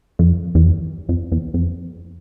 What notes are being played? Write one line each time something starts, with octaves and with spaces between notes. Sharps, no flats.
F2
E2
F2
F2
E2
F2